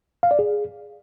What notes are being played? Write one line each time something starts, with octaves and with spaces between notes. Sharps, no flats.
F5
D5
G#4